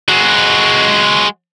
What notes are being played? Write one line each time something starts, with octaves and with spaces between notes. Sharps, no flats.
G#3 F#4